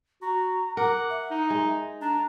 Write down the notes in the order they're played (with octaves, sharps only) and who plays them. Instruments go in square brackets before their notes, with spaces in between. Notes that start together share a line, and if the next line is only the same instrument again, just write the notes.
[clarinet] F#4 [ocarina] A#5
[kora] A#4 [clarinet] F#5 [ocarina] D6
[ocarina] E5
[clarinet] D#4
[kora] G#3
[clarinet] D4 [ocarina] A#5